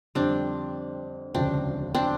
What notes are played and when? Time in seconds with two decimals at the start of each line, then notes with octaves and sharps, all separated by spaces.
0.15 F2 D3 G3 C4 D4
1.35 E1 D2 C#3 F3 C4 D4
1.95 C4 D4